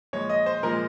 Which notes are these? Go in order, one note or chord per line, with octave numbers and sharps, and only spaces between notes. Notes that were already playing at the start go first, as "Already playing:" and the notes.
A#2 F3 G#3 C#5
D#5
C5
A#2 F3 G#3 A#4